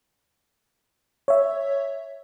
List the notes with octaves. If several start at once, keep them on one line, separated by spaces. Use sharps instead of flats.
C#5 E5